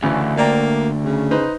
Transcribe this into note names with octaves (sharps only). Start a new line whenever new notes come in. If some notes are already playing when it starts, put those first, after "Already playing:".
D2 C#3 E3
A#3 D5 G5 A#5
C#3
D#4 B4 C5